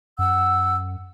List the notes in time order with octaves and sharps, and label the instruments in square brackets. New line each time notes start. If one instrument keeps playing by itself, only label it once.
[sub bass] F#2 [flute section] F#5 E6